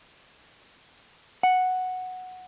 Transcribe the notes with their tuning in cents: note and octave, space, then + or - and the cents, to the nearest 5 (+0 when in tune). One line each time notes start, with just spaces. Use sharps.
F#5 -5